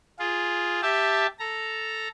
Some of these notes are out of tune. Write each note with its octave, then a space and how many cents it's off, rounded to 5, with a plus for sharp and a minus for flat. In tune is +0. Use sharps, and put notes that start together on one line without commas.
F4 +0 G#4 +0
G4 +5 E5 +0 A5 +0
A4 +0 A#5 +0